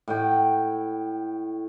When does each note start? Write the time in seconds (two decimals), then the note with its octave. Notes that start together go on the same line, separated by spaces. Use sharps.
0.08 A2 F#5 G5